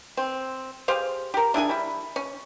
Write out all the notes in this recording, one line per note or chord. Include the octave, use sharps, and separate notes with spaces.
C4
G4 G#4 C5 F5
G4 A#4
D4 E4 G#4 G#5
G3 E4
C#4